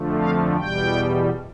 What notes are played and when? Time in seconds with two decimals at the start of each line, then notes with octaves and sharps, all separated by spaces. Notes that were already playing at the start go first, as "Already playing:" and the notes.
Already playing: F2 D3 F3 A3
0.19 F5
0.56 E2 B2 G3 G5